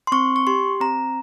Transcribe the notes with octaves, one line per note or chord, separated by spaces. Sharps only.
C6
C4 C#6
C#6
G4 C6
C4 A#5